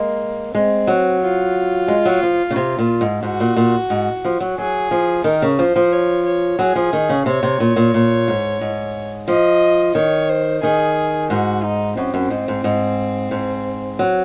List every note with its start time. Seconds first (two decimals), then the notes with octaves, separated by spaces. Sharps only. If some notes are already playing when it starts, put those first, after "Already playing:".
Already playing: G#3 A#3
0.54 G#3 C4
0.87 F#3
1.22 F4
1.88 G#3
2.05 F#3
2.23 F3
2.50 C#3
2.56 C3
2.79 A#2
3.01 G#2
3.23 G#2 F#4
3.40 A#2
3.57 A#2
3.90 G#2
4.25 F3
4.40 F#3
4.58 F#3 G#4
4.91 F3
5.24 D#3 A#4
5.42 C#3
5.59 F3 C5
5.76 F3
5.92 C#5
6.26 C#5
6.59 F#3 G#4
6.76 F3
6.93 D#3
7.09 C#3
7.26 C3 C#5
7.43 C3
7.60 A#2
7.76 A#2
7.94 A#2
8.28 G#2
8.61 G#2
9.28 F3 D#5
9.95 D#3 C#5
10.29 C5
10.63 D#3 G#4
11.30 G#2 F#4
11.64 D#4
11.97 F#2 C4
12.14 F#2
12.30 G#2
12.48 G#2
12.64 G#2
13.31 G#2
13.99 F#3